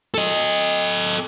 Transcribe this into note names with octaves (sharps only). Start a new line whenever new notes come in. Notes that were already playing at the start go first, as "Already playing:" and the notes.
A4 D#5